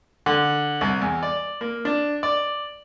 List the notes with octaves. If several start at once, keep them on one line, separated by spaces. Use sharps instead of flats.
D3
C2
E2
D5
A#3
D4
D5